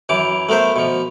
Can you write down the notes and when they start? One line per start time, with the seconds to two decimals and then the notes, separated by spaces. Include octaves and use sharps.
0.09 F#2 E3 D6
0.49 A3 B3 A#4 C5 E5
0.76 B2 F3